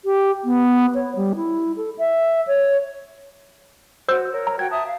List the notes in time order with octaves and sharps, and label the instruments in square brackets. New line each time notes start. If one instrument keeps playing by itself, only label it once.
[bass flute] G4
B3
C#5
G3
E4
A4
E5
C#5
[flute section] F#4 [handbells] C5 E6 G6
[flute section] A#4 C#5
[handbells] A#5
[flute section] F#4 G5 [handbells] G#6
[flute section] E5 A5 D#6
F5